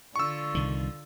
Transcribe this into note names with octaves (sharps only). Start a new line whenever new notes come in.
D3 F4 C#6 E6
C2 D#3